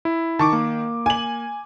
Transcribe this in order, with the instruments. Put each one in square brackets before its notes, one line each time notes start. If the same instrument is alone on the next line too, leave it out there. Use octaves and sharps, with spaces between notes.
[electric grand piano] E4
[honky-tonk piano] D#3 [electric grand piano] A5 C#6 D6
[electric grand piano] A#3
[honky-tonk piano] G#5 F#7